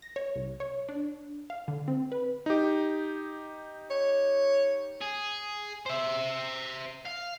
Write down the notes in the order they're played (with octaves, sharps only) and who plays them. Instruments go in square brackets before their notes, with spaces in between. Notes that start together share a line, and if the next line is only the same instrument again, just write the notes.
[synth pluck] A#6
C#5
C2
C#5
D4
F5
D3
C4
B4
[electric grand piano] D#4 G4
[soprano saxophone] C#5
[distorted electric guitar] G#4
C5 E5
F5